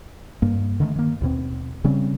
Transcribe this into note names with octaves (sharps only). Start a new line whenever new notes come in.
G2 A#3
D3 D#3 G#3 A3
D#3 A#3
D#2 B2 C4
C#3 G3 C4 C#4